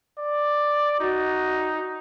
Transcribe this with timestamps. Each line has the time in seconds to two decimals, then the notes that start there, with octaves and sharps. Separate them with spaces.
0.18 D5
1.00 D#4 F#4